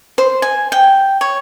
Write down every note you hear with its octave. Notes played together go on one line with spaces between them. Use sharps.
C5
G#5
G5
C#5